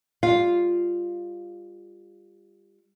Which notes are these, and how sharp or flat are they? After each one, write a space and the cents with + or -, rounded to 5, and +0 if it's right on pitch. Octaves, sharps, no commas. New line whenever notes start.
G3 +25 F4 +0 F5 +0